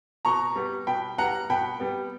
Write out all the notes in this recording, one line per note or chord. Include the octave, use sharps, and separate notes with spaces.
B2 A#5 C#6
G3 B3
B2 G5 B5
G3 B3 F#5 A#5
B2 G5 B5
G3 B3